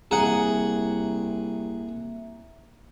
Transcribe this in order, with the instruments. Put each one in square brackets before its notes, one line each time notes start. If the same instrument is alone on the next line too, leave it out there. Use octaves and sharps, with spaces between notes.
[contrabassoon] C2 [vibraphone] A#3 E5 [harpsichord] G#4 F#5 [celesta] A#5